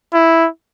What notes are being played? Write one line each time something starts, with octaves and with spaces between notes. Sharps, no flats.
E4